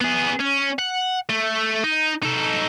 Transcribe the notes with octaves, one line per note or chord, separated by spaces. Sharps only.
B3 G#4
C#4
F#5
A3
D#4
D#4 A4